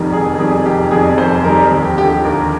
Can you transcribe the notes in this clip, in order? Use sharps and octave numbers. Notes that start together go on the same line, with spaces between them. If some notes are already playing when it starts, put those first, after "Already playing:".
Already playing: F1 F2 D#3 G3 A#4
F1 G#4
F2 D#3 G3 G#4
F1 G4
F2 D#3 G3 G#4
F1 C5
F2 D#3 G3 A#4
D#2
G4
D3 F3 G4
G4
D#2 A#4